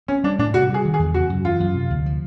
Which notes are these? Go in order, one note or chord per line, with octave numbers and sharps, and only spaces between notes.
C4 C#4
G3 D4
A2 D4
C3 F#4
G3
G#4
D#3
G#4
E2
C#3 F#4
F#2
E3 F4
F#2
C3
D2
F3